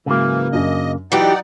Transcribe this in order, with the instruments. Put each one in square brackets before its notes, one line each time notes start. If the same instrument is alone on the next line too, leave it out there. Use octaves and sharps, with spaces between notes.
[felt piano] G#2 F#3 [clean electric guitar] C#3 A#3 [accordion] E3
[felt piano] F#2 D4 [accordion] D#5
[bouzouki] E3 G4 [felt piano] F#3 [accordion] D#4 D5 F#5